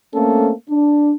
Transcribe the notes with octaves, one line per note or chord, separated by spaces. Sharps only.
A3 A#3 C4 C#4 A4
D4